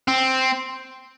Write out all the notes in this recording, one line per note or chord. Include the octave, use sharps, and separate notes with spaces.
C4